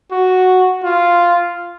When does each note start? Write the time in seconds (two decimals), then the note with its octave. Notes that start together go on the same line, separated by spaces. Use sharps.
0.11 F#4
0.84 F4